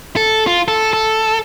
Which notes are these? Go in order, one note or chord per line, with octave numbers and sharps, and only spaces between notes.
A4
F4
A4
A4